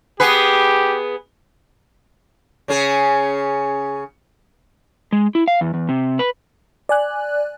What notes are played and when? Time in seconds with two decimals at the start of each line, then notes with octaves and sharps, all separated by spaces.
0.20 B3 G4 G#4 B4
2.68 C#3 C#4 G#4
5.12 G#3
5.35 E4
5.48 F5
5.61 E2
5.74 E2
5.89 C3
6.19 B4
6.89 D5 G#5 F#6